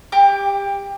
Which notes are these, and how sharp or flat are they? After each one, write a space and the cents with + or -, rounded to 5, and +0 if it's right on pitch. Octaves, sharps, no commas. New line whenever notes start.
G4 +25 D6 +0